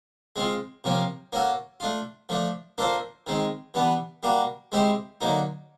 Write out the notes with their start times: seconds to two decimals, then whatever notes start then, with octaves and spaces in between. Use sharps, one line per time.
0.36 G#3 C4 F4
0.84 C3 F3 A#3 C#4
1.33 A#3 C#4 F#4 A4
1.80 A3 D4 F4
2.29 F3 A3 D4
2.78 A#3 D4 F4 A4 C5
3.27 D#3 G#3 C4
3.74 E3 G3 B3 D4
4.23 G3 A#3 D4 F#4
4.72 G#3 C4 E4 G4 C5
5.21 D3 F#3 A#3 D#4